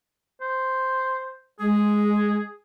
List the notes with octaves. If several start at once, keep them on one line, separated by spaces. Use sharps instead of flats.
C5
G#3 G#4